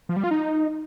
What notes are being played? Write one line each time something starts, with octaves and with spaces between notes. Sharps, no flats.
F3
G3
F4
D#4